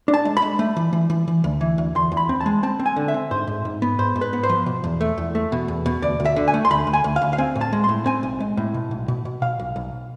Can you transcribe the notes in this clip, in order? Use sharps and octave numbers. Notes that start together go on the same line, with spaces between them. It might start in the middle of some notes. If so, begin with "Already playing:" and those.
D4
A5
G#3
B5
G#3
A3
E3
E3
E3
E3
D2
E3
D2
E2 C6
E2
B5
C4
A5
G#3
C4 A5
C4
G#5
D3
E5
C4
G#2 C5
G#2
G#2
B3
G#2 C5
G#2
B4
B3
C5
F3
B2
E2
A3
E2
A3
B2
E2
B2
D2 D5
D2
E5
D3
G#5
A3
C6
D2 B5
D2
G#5
D2
F5
D2
F5
C4 G#5
A2
A5
G#3
A2 C6
C4 G#5
B1
G#3
A2
B2
B1
B2
B2
B2 F5
B1
B1